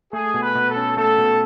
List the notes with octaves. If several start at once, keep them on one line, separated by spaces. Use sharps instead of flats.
A3 G#4
B2
B4
B2
A4
C#4
A3 A4
B2